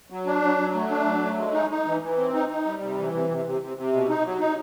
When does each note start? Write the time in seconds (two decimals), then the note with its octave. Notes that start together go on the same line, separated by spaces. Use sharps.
0.10 F#3
0.27 D4
0.42 F#3
0.58 F#3
0.75 A3
0.90 D4
1.06 F#3
1.23 A3
1.38 G#3
1.54 D#4
1.70 D#4
1.86 E3
2.02 E3
2.18 C4
2.34 D#4
2.49 D#4
2.65 G3
2.82 C3
2.97 E3
3.13 C3
3.29 C3
3.45 C3
3.61 C3
3.77 C3
3.93 B2
4.09 D#4
4.25 F#3
4.40 D#4